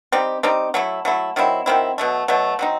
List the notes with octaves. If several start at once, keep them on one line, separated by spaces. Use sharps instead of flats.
G3 C4 D#4 G4
G3 C4 D#4 G4
F#3 A3 E4
F#3 A3 E4
D#3 F#3 C4 E4
D#3 F#3 C4 E4
B2 F#3 A3
B2 F#3 A3
F#3 C4 D#4